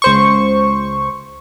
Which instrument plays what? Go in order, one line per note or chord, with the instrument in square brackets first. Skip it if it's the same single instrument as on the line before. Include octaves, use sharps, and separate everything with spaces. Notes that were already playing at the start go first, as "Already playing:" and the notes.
[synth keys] C#2 C5 C#6